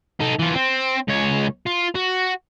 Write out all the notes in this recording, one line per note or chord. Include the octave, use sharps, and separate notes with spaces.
D#4 A4
E3 F4
C4
C#2 C#5
F4
F#4